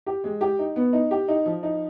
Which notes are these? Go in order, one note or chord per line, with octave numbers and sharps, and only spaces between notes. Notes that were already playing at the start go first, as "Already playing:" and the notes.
G4
G#3
G4
D#4
B3
D#4
G4
D#4
F3
D#4